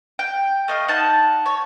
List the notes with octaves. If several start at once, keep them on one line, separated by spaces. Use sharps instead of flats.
G5
A3 D#5 F5
D#4 F#5 A5
C#5